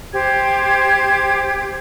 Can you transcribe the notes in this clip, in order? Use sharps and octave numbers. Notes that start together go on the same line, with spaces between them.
G4 C5 G#6